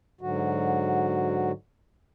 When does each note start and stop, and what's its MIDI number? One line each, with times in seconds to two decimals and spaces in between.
0.21 1.52 44
0.21 1.52 50
0.21 1.52 54
0.21 1.52 66